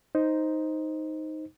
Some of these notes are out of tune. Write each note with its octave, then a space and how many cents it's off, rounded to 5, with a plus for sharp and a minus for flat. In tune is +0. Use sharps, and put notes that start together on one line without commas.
D#4 +5 C5 +0